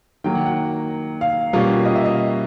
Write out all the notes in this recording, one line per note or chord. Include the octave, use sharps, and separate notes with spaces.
D#3 F#3 A#3 G5
F#5
F#5
F5
B2 G3 A#3 C#4 F4
D#5
E5
D#5